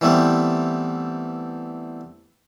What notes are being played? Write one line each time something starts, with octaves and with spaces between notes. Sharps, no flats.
E3 G3 A3 B3 C4